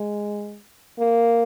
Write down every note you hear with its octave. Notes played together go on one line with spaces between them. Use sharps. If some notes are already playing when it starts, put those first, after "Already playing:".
Already playing: G#3
A#3